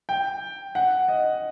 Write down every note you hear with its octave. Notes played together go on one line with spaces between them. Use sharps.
G5
F#5
D#5